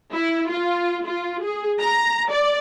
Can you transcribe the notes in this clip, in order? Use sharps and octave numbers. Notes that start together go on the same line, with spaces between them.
E4
F4
F4
G#4
A#5
D5